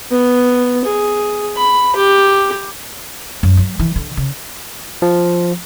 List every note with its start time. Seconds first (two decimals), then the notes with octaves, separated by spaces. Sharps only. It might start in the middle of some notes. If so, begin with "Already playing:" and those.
0.11 B3
0.84 G#4
1.56 B5
1.95 G4
3.43 F#2
3.57 F#3
3.79 E3
3.96 D3
4.17 C#3
5.02 F3